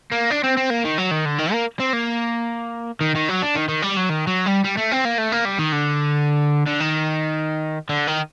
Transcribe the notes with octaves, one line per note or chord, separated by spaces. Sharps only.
A#3
D4
C4
C4
A#3
D#3
F#3
D#3
D3
D#3
A#3
C4
A#3
D#3
D#3
F#3
D4
D#3
D#3
G3
F#3
D#3
F#3
G3
G3
A3
C4
A#3
A3
A#3
G3
D#3
D3
D3
D#3
D3
D#3